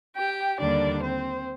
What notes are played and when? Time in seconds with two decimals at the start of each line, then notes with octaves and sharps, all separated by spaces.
0.17 G4 G5
0.60 D#2 D3 G3 A#3 D4 D5
1.04 C4 C5